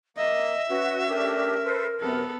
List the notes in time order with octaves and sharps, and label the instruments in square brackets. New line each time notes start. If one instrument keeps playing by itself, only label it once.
[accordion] A#3 [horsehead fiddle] D#5 [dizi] E5
[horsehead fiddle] C#4 [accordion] F#4 [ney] B4
[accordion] A3 D4 G4 [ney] A#4
[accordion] A4 B4 C5
[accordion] F#2 C3 [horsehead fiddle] B3 A4